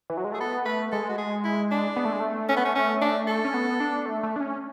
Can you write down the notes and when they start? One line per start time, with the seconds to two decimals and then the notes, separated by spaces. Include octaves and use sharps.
0.10 E3
0.17 F#3
0.25 G#3
0.32 A3 G#4
0.40 B3 A4
0.65 A3 B4
0.92 G#3 A4
1.09 F#4
1.18 G#4
1.44 E4
1.71 D4
1.96 B3
2.05 A3
2.12 G#3
2.20 A3
2.49 C#4
2.56 B3
2.65 C#4
2.75 C#4
3.01 D4
3.27 A4
3.45 C#4
3.54 B3
3.80 D4
4.06 A3
4.23 A3
4.36 D4
4.40 C#4